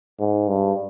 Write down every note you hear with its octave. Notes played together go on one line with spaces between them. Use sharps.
G#2
G2